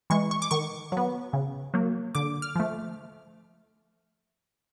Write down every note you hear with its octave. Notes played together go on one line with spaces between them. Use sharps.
E3 G#3 C#6
C#6
D6
D#3 C#6
F#3 B3
C#3
F#3 A#3
D3 D6
F6
F3 A3